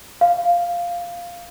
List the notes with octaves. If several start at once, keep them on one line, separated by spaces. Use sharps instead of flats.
F5